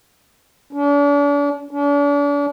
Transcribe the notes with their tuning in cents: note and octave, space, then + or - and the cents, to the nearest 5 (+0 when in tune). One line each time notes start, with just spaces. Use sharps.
D4 -40
D4 -40